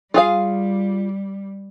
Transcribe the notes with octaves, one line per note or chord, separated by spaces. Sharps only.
G3 F4 G#4 F5